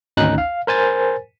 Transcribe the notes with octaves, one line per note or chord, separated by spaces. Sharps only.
G#1 D2 C#4 D#4 F#6
F5
A#4 C5 G#5 A6